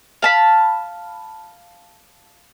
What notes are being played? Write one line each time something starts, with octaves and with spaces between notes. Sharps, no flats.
F5 A5 B5